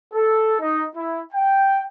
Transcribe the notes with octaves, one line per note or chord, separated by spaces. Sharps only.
A4
D#4
E4
G5